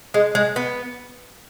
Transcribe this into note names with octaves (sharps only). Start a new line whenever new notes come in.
G#3
G#3
B3